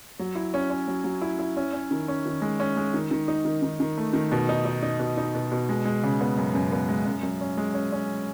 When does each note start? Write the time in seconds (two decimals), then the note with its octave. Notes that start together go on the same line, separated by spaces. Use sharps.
0.19 F#3
0.35 E4
0.54 C#4
0.70 C#4
0.88 F#3
1.04 F#3
1.22 E4
1.39 E4
1.57 C#4
1.73 C#4
1.91 D#3
2.08 C#4
2.26 D#3
2.42 G#3
2.60 C#4
2.77 G#3
2.94 D#3
3.11 D#3
3.28 D#4
3.45 D#3
3.62 D#3
3.80 D#3
3.97 A3
4.13 D#3
4.32 B2
4.49 D#4
4.65 D#4
4.83 D#4
5.00 B2
5.17 D#4
5.35 B2
5.52 B2
5.69 G#3
5.85 G#3
6.03 C#3
6.21 B3
6.37 F#2
6.55 F#2
6.72 B3
6.89 G#3
7.05 F#2
7.23 F#2
7.41 C#4
7.57 G#3
7.74 C#4
7.92 C#4